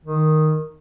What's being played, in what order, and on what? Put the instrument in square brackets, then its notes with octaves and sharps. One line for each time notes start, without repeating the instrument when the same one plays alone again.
[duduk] D#3